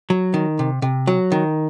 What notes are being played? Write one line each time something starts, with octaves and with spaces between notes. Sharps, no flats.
F#3
D#3
C3
C3
F#3
D#3